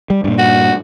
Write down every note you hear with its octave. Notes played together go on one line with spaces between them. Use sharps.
G3
G2 A#2
F#4